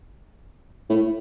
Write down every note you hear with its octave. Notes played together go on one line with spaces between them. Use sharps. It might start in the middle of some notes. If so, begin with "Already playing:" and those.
A2